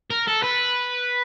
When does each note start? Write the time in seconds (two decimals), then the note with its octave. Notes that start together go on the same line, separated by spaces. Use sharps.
0.10 A#4
0.27 A4
0.43 B4